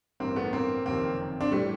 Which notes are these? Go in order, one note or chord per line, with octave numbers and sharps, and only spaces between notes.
A1 G2 E3 A#3 C4
A3 B3
A#3 C4
F#1 F2 C3 D#3 A#3 C4
C4 D4
A2 E3 G3 A3